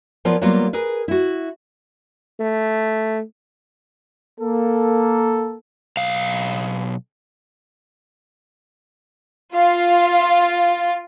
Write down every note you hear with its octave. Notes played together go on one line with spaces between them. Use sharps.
F3 B3 F4 A#4 C#5 D5
F#3 G3 A#3 B3 F4
G#4 A#4 B4
E4 F#4
A3
A#3 A4
B1 F5
F4 F5